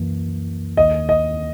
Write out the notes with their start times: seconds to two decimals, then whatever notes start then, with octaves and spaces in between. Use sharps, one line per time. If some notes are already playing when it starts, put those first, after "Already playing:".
Already playing: F#2 E3 A#3
0.77 D#2 D#3 A#3 D#5
1.09 D#5